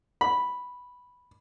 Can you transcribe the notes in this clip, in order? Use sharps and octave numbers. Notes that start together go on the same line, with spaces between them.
B5